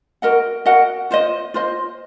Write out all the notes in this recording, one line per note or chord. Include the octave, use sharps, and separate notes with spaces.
F#4 A#4 D#5 F#5
F#4 A#4 D#5 F#5
F4 C5 D#5
F4 C5 D#5